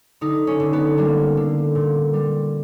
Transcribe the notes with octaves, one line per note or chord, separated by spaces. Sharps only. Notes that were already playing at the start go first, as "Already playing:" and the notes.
D3 D#4
C#4
D3
B3
G3 A#3
D3
A#2
G3